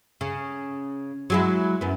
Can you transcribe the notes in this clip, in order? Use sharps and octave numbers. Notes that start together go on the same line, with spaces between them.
C#3
F#3 G#3 E4
F#2 B3